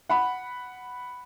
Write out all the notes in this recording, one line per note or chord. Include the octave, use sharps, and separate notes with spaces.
F#5 B5